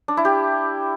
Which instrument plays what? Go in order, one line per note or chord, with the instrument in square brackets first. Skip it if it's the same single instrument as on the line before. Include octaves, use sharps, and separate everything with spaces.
[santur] D4
E4
G4